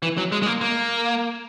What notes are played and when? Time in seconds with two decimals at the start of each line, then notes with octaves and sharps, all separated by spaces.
0.03 E3
0.17 F#3
0.32 G#3
0.42 G#3
0.46 A#3
0.61 A#3